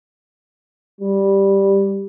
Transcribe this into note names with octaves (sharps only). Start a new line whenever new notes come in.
G3